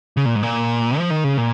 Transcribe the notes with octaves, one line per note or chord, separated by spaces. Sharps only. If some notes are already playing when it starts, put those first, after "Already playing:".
C#3
A#2
G#2
A#2
F3
D#3
C#3
A#2